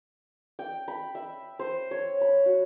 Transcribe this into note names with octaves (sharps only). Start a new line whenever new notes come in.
G5
B5
E5
C5
C#5
B5
F#4